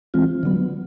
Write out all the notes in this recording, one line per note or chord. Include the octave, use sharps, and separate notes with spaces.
E3 G#3 C4 F4
D3 F#3 B3